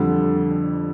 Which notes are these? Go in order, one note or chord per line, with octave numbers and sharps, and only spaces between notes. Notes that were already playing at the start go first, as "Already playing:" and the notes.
Already playing: F2 D3 G3 A4